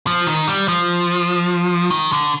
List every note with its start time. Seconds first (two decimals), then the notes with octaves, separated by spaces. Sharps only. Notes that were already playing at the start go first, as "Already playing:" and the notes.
0.07 F3
0.27 D#3
0.48 G3
0.68 F3
1.91 D#3
2.12 D3